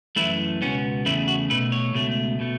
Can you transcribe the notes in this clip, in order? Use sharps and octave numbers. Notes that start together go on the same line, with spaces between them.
F#2 E3 A3 E4
C#2 B2 B3 C#4
E2 C#3 A3 E4
F#4
B2 A3 B4
C#5
C#2 B2 A3
B2 A3